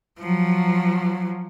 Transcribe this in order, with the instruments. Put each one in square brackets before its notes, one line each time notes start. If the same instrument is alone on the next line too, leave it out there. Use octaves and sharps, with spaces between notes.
[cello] F3 F#3